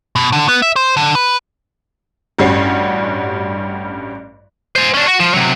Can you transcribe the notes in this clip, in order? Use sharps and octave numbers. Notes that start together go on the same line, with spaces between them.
B2
D3
B3
E5
C5
D3
B4
A1 G2 G3 C#4 F#4 C7
C5 G#5
C#4 D4
F#4
F3
C3 F#3